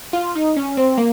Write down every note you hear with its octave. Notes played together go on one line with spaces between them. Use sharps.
F4
D#4
C#4
C4
A#3